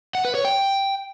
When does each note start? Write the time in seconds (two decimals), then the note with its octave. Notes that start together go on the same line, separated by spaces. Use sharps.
0.15 F#5
0.25 B4
0.35 C#5
0.45 G5